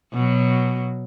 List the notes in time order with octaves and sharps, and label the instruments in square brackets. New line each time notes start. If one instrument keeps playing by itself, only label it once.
[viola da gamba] B2 F#3